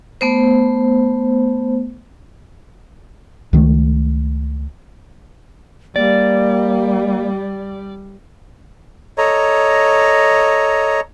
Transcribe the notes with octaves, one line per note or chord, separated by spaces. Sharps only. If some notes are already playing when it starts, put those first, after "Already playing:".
A3 B3 C5
C#2 D#3 G3 A3
G3 A#3 D5
A4 C#5 D#5 A#5